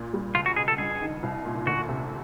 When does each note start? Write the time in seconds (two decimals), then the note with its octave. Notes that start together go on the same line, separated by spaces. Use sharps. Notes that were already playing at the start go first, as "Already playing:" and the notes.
Already playing: A#2
0.13 G3
0.35 C#2 F4
0.46 F#4
0.56 B2 G#4
0.68 A4
0.78 G2 G#4
1.01 D#3
1.23 C2
1.45 A#2
1.66 D2 F#4
1.88 C3